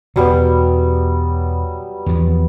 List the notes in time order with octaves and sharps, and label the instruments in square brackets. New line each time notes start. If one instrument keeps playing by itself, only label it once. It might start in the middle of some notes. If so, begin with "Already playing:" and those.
[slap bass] E2 B2 [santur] F#3 G3 B3
[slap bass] E2 F3